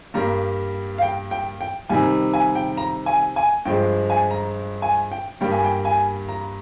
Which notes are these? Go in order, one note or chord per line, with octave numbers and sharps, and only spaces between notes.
G2 G3 A#3 A#5
F5
G5
G5
G5
C3 D#3 G3 G#5
G#5
G5
A#5
G#5
G#5
G2 F3 G#3 G5
G#5
A#5
G#5
G5
G2 G3 A#3 G5
G#5
G5
G#5
A#5